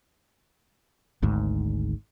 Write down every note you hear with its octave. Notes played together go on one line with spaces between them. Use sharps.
G#1 D2 G#2